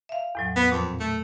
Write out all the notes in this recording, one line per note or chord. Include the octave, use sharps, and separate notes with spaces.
E5 F5
E2 A2 F#3
B3
F2 A#2
A3